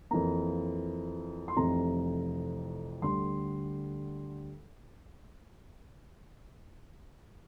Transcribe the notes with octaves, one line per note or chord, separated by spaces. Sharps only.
F2 E3 A#3 A#5
C6
F1 F2 C3 E3 A#5
D2 D3 G3 C6